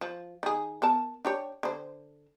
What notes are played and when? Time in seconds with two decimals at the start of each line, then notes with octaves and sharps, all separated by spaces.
0.01 F3
0.43 D#3 G#4
0.82 B3 A#4 A5
1.25 D4 G4 C#5
1.63 D3 C5